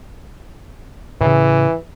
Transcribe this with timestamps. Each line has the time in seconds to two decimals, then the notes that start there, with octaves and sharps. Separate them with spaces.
1.21 A2 C#3 E3